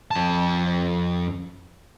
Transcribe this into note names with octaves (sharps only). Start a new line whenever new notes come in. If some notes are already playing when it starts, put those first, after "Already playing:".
F2 A5